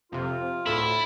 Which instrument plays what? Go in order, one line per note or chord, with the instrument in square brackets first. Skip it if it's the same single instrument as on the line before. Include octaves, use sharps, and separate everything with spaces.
[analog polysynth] F2 C3 [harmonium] F4
[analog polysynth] D2 A2 [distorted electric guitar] E4 [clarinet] A4